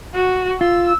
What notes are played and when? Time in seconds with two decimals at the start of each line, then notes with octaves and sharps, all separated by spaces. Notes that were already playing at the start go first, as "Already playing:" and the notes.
0.14 F#4
0.61 F4 E6